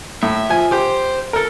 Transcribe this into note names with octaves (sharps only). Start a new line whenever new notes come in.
A2 E5
F3 G#5
G4 C5 G5
A4 A#4